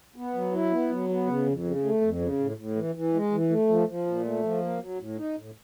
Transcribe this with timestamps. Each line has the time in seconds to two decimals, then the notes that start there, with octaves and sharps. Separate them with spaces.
0.16 B3
0.34 F#3
0.53 E4
0.72 B3
0.90 F#3
1.09 B3
1.27 C#3
1.46 F2
1.64 C#3
1.83 A3
2.01 F2
2.21 C#3
2.39 A2
2.57 A2
2.75 E3
2.95 E3
3.14 G#3
3.31 E3
3.50 A3
3.69 F3
3.87 F3
4.06 A#2
4.25 A3
4.43 F3
4.61 A#3
4.80 F#3
4.99 A2
5.18 D#4
5.36 A2